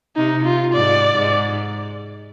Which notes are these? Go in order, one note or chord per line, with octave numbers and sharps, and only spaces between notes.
C3 D#4
F4
G#2 D5
G#2